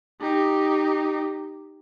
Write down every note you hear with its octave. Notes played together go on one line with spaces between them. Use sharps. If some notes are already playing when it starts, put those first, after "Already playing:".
D#4 G4